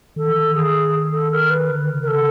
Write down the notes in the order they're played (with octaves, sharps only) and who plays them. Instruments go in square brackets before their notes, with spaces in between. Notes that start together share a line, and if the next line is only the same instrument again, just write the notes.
[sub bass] D#3 [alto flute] A4
[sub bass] E3
D#3
[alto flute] G#4
A4
A#4
B4
[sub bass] D3
C#3
[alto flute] A#4
A4